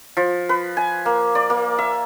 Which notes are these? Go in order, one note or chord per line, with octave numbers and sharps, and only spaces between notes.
F3
B4
G#5
A#3
D5
A#3
E5